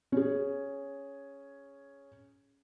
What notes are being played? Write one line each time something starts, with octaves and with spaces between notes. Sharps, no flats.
C#4 G#4